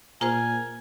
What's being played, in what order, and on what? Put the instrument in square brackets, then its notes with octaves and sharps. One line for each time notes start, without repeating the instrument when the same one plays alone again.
[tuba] A#2 [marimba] F4 G#4 C5 [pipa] A#4 [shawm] G#5